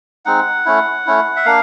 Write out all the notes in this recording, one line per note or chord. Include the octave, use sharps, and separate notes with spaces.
G#3 C4 D#4 F#5
A3 C#4 E4
A3 C#4 E4
E5
A#3 D4 F5